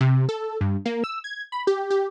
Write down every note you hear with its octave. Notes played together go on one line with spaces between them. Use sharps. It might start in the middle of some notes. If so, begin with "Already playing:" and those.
C3
A4
G2
A#3
E6
G#6
B5
G4
G4